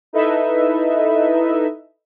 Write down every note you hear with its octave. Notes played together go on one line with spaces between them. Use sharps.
D#4 E4 A4 B4 D#5 E5